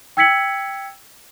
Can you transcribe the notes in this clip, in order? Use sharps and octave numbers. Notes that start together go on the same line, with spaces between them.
G5 E6 G#6 B6 C#7 F#7